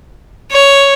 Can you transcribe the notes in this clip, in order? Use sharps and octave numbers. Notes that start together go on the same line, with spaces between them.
C#5